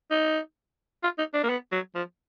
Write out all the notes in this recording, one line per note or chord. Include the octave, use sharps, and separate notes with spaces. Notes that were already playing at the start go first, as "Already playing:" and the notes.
D#4
F4
D#4
D4
A#3
B3
F#3
F3